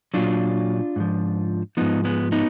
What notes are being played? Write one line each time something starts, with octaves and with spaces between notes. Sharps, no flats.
A#2 F#3 D4 F4
G#2 F3
G#2 F3 B3 D#4
G#3 B3
B3 D#4